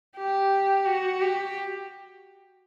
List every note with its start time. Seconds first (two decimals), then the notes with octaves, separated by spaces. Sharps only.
0.17 G4
0.86 F#4
1.21 G4